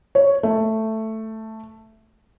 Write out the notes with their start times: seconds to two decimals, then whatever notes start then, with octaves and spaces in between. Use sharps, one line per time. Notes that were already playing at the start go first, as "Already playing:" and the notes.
0.15 C#5
0.43 A3